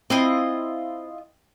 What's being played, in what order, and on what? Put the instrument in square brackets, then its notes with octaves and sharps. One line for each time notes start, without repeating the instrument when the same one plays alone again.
[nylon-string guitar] C4 [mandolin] E4 F4 D#5